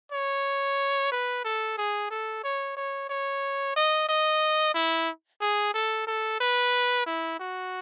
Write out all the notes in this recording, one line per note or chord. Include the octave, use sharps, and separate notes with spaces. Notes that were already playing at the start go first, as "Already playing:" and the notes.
C#5
B4
A4
G#4
A4
C#5
C#5
C#5
D#5
D#5
E4
G#4
A4
A4
B4
E4
F#4